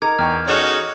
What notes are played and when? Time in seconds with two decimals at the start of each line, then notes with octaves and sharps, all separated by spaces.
0.02 D#4 A#4 D6 G#6
0.19 E2 G5 C#6 F6
0.48 B3 C#4 D#4 F#4 G#4 A4 C#5 E7